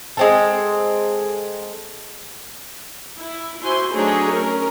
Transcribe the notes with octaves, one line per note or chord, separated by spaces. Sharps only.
G#3 C4 A4
E4
E4 F#4 C5 G#5 C6
F#3 A3 D4 D#4 G#4 C#5
C#4 A#4